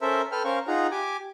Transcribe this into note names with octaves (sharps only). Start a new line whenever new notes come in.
C#4 A4 A#4 C5 E5
A4 B4 G5 F6
C#4 A#4 C5 F5 C#6
D#4 F4 G#4 F#5 A#5
G4 G#5 D6